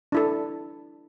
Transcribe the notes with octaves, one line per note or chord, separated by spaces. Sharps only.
D4 E4 A4